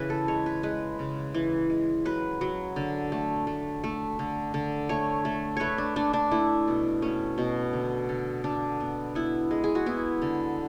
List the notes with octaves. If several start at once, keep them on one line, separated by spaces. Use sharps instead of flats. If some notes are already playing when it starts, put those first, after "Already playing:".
Already playing: C#3 E3 B4
A4
G#3 C#5
B4
G#3 B4
C#3
E3
G#3
F#3 B4
F#3
D3
A3
A3
A3
D3
D3
A3 C#5
A3
A3 B4 C#5
D4
A3 D4
D4
A3 E4
B2
A3 C#4
B2
D3
D3
D3 D4
B3
B3 E4
G#3
G#4
F#4
B3 E4
D3